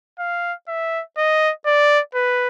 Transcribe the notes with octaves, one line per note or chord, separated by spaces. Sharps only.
F5
E5
D#5
D5
B4